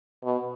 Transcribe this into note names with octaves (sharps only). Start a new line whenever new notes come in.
B2